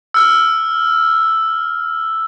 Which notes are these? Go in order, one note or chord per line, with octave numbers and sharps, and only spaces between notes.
E6 F6